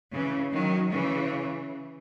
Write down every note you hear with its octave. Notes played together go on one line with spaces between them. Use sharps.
C#3 E3
D#3 F#3
C#3 E3